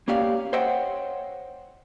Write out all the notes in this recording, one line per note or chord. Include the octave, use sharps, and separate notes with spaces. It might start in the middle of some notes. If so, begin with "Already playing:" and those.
A#3 C#4 G4 D5 F5
C5 C#5 D#5 E5 F#5 G5